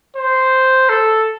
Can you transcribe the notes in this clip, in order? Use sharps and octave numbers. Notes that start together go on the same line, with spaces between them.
C5
A4